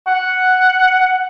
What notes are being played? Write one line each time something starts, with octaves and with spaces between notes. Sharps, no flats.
F#5